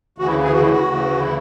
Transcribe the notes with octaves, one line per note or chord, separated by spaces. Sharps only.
D2 C#3 E3 F#4
E4
G#4
F#4
E4
F#4
D2 C#3 E3
E4